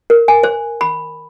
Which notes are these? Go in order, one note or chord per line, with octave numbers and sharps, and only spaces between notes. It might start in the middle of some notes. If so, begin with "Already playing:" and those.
A#4
G#5
C5
B5